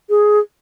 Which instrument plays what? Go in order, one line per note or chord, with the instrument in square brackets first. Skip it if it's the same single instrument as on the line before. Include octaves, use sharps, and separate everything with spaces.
[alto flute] G#4